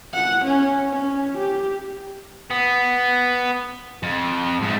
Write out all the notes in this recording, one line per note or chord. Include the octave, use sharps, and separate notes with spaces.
F#5
C#4
C#4
G4
B3
F2
G#2 A3